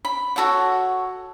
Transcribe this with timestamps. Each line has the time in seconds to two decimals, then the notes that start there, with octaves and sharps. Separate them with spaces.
0.05 B5
0.36 F#4 A4 C#5 F#5